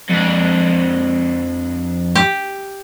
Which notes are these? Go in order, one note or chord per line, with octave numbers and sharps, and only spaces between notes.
F2 D4
G4